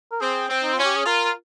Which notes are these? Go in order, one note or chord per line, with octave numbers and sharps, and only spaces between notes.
A#4
C4 G#4
C4
D#4
C#4 F4
G4
G#4
F4 A#4